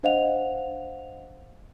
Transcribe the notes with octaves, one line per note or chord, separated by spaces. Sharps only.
D4 C5 D#5 F5 F#5 F7